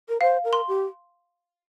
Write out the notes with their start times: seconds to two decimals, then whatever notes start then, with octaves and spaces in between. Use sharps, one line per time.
0.09 A#4
0.21 C5 F5
0.44 A#4
0.53 C6
0.68 G4